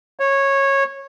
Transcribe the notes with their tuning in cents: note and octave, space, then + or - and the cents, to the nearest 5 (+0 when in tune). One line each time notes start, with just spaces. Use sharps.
C#5 -15